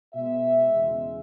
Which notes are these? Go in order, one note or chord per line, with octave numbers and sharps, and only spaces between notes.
B2 G#3 E5
E2 C#3 G#3